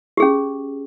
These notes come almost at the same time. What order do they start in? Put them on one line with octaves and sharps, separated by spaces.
G4 G#4 C#4